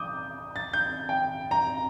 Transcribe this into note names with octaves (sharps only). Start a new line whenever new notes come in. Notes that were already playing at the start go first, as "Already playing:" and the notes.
Already playing: D6 D#6 G6
A6
G6
G5
A#5